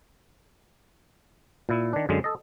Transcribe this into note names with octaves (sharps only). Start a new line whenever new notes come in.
A#2 E4
D#3 D4
F#2 D3 G#3
A4 D#5